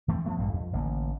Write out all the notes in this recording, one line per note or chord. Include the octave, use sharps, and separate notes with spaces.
E3 A3 B3 C4
F3 A3 B3
A#1 G2 E3 G#3
F2
A1 D3 G#3 A#3